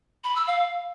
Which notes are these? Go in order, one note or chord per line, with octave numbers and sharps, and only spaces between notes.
B5
E6
F5